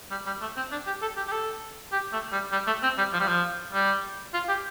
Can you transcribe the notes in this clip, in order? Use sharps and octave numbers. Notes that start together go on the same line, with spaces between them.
G3
G3
A3
C4
D4
G4
A4
G4
G4
A4
G4
A3
G3
G3
A3
C4
G3
F3
G3
F3
G3
F4
G4